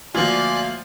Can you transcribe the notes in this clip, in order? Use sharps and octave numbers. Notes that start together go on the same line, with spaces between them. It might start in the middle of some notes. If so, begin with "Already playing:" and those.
D2 F3 A#3 F4 D5 F5 G#5 F#6